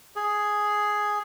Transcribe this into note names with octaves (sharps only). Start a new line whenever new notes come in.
G#4